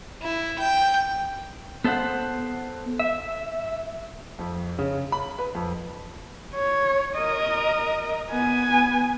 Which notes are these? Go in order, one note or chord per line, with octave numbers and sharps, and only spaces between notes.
E4
G5
B3 A4 C5 D5 F#5
E5
F2
C#3
B5
B4
F2
C#5
A#4 D#5
B3 G#5